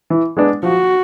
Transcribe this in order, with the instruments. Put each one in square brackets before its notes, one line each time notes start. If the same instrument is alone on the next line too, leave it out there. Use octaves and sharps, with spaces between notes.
[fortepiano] E3
G#3 B3 D4
[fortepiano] F3 [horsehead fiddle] F#4